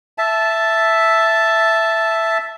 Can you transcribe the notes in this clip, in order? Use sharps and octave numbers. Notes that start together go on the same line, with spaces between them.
E5 A5